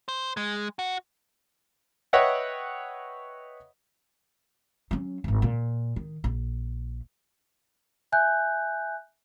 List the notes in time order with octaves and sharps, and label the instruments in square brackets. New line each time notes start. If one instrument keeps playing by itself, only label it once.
[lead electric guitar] C5
G#3
F#4
[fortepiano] B4 C#5 D#5 E5 F#5 G5
[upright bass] F#3 C#4
D1 G#1
A#2
D#3
A#1
[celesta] E5 G#5 F#6 G6